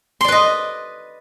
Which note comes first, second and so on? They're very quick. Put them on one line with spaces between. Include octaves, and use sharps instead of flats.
C6 D5 B4 D#5